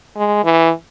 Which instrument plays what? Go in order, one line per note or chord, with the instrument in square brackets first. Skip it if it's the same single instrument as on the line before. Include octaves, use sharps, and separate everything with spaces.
[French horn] G#3
E3